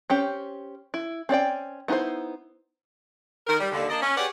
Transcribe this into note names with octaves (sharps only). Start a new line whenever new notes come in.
C4 C#4 G4
E4
C4 C#4 D5 G5
B3 D#4 E4 A#4 C5
D#3 A#4
G3
D#2 D3
A#3 D4 D5 D#5
C#4
G4 G#4 B4 C#5 D5 F#5